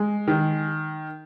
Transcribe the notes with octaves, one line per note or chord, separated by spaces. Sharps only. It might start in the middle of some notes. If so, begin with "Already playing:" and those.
Already playing: G#3
D#3